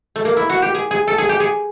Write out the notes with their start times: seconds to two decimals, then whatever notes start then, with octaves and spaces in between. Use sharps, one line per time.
0.16 A3
0.25 A#3
0.37 E4
0.50 F#4
0.62 G4
0.74 G#4
0.91 G#4
1.08 A4
1.18 G#4
1.29 G4
1.40 G#4